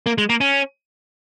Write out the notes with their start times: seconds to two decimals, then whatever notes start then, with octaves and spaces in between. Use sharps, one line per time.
0.06 A#3
0.18 G#3
0.29 A#3
0.41 C#4